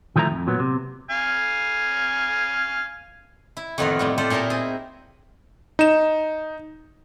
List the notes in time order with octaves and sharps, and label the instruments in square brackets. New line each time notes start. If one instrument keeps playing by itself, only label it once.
[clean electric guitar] D#3 F3 A3 E4 A#5
F2
A#2 F#3 B3
C3
[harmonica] F5 G#5
[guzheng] E4
F2 A2 D#3 B3 F4 A#4
A2 G3 C4
F4 G4 A4 C5 D5
A#2 D#4 E4 A#4 A5
C4 G#4
[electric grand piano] D#4 E7